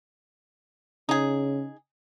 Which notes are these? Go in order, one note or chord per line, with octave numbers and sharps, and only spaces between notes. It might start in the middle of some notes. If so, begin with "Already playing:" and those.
C#3 D#4 G#4